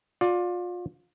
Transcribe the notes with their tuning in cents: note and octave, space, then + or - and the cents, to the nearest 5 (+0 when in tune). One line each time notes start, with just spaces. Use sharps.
F4 +30 D5 +0